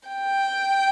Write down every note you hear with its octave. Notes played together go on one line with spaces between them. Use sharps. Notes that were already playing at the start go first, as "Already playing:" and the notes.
G5